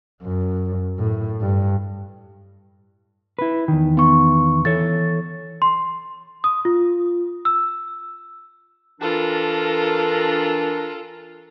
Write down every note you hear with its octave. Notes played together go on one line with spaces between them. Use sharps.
F#2
A2
G2
E4 B4
E2 D#3
B3 C#6
E3 A4 C#5 A6
C6
D#6
F4
E6
E3 D4 F4 A4 A#4